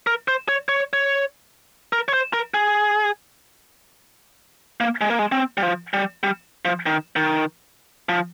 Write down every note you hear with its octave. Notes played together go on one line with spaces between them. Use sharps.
A#4
C5
C#5
C#5
C#5
A#4
C#5
C5
A#4
G#4
A#3
G#3
A#3
G#3
C4
G3
F3
G3
G3
F3
D#3
D#3
F3